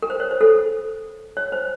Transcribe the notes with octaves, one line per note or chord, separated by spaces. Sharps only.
A#4
C5
C#5
C5
A4
C#5
C5